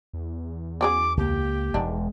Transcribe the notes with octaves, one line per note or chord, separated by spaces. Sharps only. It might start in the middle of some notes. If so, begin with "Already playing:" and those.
E2
F#3 C#4 G#4 D6
C#2 A#3 G4
E1 D#3 G3 G#3 D4